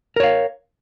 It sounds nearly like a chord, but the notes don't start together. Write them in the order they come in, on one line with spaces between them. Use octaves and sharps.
A#4 C#5 F5